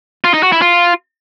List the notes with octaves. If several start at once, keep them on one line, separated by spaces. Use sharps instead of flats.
F4
D#4
F#4
E4
F4